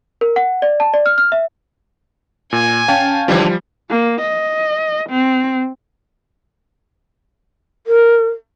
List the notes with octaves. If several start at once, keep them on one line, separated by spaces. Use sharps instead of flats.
A#4
F#5
D5
A5
D5
F6
F6
E5
A#2 G#5
C#4 F5 G5 A5
G#2 D3 E3 F3 G3
A#3
D#5
C4
A#4